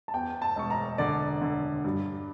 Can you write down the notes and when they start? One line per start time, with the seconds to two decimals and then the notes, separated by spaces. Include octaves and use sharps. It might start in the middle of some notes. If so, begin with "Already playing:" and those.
0.08 A5
0.14 E2 G5
0.42 A5
0.56 E1 C#6
0.70 A#5
0.98 D3 D5
1.41 D3
1.84 G2